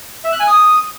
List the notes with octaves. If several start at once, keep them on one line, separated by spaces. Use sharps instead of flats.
E5
F#6
G#5
D#6